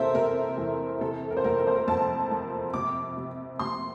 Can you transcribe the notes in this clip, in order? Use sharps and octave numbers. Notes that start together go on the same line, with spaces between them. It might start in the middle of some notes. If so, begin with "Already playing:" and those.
Already playing: E2 C3 A4 A#4 C5 E5
C3 A#4
E2
C3 A4
A#4
C5
F2 A#4
A#4
C5
A#4
F2 A5
F3
C3 D6
C3
C3 C6